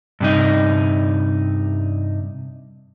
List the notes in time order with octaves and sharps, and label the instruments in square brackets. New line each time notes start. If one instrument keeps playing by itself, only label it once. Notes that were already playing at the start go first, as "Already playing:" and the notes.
[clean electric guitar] G2 C3 D#4